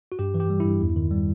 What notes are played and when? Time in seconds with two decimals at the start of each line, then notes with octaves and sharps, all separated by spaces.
0.12 F#4
0.19 G2 G4
0.34 E3
0.40 G4
0.50 G3
0.60 G2 E4
0.81 E2
0.96 D#3
1.11 G3